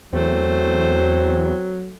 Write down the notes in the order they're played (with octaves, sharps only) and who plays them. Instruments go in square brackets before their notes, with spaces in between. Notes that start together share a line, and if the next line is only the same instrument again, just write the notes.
[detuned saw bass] E2 [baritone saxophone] F#3 [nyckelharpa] A3 C5 [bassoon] C4